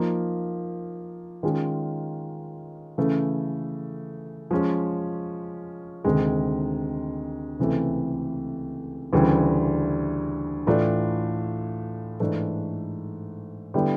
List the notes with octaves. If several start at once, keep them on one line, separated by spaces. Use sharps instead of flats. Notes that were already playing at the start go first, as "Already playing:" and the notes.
Already playing: F3 A#3 D#4
D#3 G#3 C#4 F4
C#3 E3 A3
F3 G#3 C#4
D2 C3 D#3 G#3
C#2 C3 E3 A3
D2 C#3 E3 G3
A2 E3 A3 D4 F4
G#2 E3 A3 D4
D3 G3 B3 E4